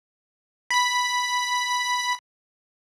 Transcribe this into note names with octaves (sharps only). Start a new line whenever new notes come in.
B5 B6